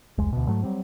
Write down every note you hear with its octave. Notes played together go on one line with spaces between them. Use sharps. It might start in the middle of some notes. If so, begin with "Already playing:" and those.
F1 C#2 G#3
D2 B2
G#2 F#3 A3
F#3 G3 C4